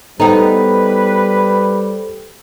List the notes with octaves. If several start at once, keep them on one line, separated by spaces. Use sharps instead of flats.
G3 B3 D#4 A4 B4 C5 G5